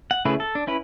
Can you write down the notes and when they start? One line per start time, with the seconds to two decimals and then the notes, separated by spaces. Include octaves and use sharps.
0.11 F#5
0.25 C#3 A3 E4 G#4 B4
0.40 A4
0.55 D4
0.67 C#4 E4 B4